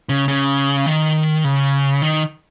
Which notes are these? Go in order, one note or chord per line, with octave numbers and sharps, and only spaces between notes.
C#3
C#3
D#3
C#3
D#3